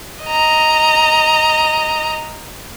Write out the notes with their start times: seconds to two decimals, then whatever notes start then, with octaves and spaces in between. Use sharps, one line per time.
0.24 D#5 A#5